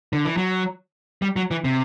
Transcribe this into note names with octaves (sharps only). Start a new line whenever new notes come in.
D3
E3
F#3
G3
F#3
E3
C3